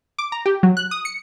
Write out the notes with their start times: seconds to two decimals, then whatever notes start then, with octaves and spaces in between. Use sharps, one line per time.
0.19 D6
0.32 A#5
0.46 G4
0.63 F#3
0.77 F#6
0.91 D#6
1.05 C#7